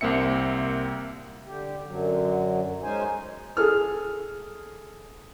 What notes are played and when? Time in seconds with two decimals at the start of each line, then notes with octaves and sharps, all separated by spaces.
0.01 C2 A#3 C4 E5 C#7
1.46 D3 G4
1.86 F#2 D3 F#3
2.83 G#3 C#4 D#4 C5 G#5
3.57 G#4 A4 F6